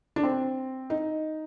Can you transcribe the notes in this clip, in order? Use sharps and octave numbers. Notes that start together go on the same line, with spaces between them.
D4
C4
D#4